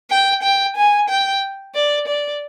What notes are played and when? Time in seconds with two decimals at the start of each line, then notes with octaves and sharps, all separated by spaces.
0.10 G5
0.43 G5
0.76 G#5
1.09 G5
1.75 D5
2.08 D5